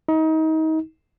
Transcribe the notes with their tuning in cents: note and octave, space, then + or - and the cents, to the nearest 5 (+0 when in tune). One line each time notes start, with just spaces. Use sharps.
D#4 +30